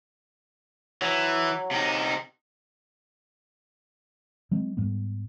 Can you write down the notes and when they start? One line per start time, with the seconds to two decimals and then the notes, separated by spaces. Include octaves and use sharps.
1.02 E3 F#3
1.71 C3 D#4
4.51 F#3 G#3 C4
4.77 G#2 G3 B3